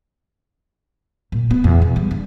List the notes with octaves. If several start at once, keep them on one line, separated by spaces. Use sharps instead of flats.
A#2
B3
E2
B2
G3
D4